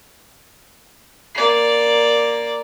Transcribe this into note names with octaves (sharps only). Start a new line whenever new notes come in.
A#3 D5